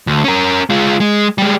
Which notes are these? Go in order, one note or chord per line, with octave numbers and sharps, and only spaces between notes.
D2
C#4 A#4
G#3 F4
G#3
G3 G#3